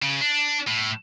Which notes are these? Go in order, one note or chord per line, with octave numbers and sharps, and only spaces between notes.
C#3
D4
A2